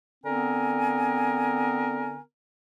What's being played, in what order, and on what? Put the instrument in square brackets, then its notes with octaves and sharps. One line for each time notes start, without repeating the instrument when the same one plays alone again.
[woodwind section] D3 B3 C4 A#4 G#5